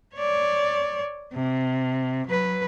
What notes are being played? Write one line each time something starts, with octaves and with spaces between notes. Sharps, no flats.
C#5 D5
C3
F#3 B4